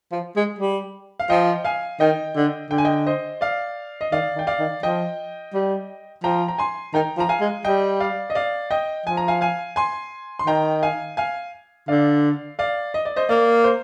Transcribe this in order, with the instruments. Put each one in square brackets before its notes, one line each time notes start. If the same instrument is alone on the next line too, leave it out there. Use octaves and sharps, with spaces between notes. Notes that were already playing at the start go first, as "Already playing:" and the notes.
[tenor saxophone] F3
G#3
G3
[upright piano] F5
[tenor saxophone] F3 [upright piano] D#5 G5
[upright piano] F5 G#5
[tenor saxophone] D#3 [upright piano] D#5 G5
[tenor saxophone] D3
[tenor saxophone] D3 [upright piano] G5
[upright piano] G#5
D#5 G5
C5 D#5
D5 F5
D#5
[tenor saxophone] D#3 [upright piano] D5 F5
[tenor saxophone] D#3
[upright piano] G5
D5 F5
[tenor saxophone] D#3
[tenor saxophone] F3 [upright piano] D#5 G5
[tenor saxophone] G3
[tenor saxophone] F3 [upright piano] G5 A#5
[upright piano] A#5
G#5 C6
[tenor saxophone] D#3 [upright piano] G5 A#5
[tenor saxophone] F3
[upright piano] A#5
F5 G#5
[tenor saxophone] G#3
[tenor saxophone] G3 [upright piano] D#5 G5
[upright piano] D5 F5
D#5
D5 F5
D#5 G5
[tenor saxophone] F3 [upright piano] G#5
[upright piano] A#5
F5 G#5
F5 G#5
G#5 C6
C6
[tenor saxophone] D#3 [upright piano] G5 A#5
[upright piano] F5 G#5
F5 G#5
[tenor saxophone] D3 [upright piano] D5 F5
[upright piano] D5 F5
D#5
D5
C5 D#5
[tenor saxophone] A#3 [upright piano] D5
[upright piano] C5